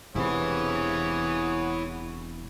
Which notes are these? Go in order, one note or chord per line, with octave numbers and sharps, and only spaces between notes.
E1 C3 E4 G#4 B4 C#5 F#5